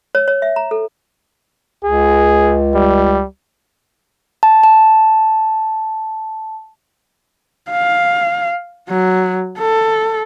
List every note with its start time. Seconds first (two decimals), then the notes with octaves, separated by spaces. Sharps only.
0.15 C#5
0.28 C#5
0.42 E5
0.56 A#5
0.71 A4
1.84 C#2 G#4
2.75 G3
4.43 A5
4.63 A5
7.71 F5
8.89 F#3
9.59 A4